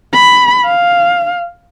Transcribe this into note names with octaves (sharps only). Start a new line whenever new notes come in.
B5
F5